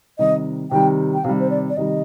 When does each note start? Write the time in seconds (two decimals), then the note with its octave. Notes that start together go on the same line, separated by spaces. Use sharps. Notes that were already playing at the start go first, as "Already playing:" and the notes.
0.19 C3 D#3 G3 D#5
0.71 C3 D#3 G3 G5
1.14 G5
1.24 C3 D#3 G3 F5
1.40 C5
1.50 D5
1.70 D5
1.77 C3 D#3 G3 D#5